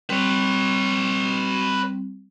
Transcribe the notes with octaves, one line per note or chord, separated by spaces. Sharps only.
G3 C4 B4 C#5